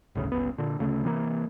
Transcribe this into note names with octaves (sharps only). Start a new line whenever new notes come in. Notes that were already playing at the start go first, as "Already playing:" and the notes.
G1 D2 A2 C#3
G1 C#2 B3
A#2 D3
D2 C#3 A3
C3 E3 G#3 A#3